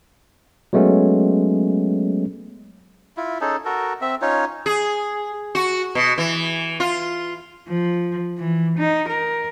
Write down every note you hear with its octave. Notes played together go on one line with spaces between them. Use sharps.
F#3 G#3 A3 B3 C#4
E4 F4
C#4 D#4 G#4 A4
F#4 A4 A#4
C4 E5
C#4 D#4 F4 C#5
G#4
F#4
B2
E3
F4
F3
E3
D#4
A#4